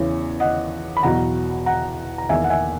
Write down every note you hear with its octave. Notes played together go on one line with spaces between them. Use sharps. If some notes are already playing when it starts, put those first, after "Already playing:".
Already playing: E2 C#3 E3 C#5
D#5 F#5
B5
E2 B2 F#3 F#5 A#5
F#5 A#5
A#5
E2 D#3 A#3 E5 G#5
F#5
E5 G#5